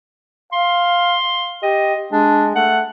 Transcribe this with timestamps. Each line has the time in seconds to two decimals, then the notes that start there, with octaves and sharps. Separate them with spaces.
0.53 F5 C6
1.63 G4 D#5
2.12 G#3 D4
2.56 A3 F#5